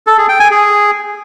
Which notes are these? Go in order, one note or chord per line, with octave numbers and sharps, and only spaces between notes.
A4
G#4
G5
G#5
G#4